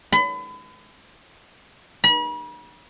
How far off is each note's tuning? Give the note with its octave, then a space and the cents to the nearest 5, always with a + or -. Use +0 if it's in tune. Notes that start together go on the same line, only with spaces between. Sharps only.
B5 +35
B5 -40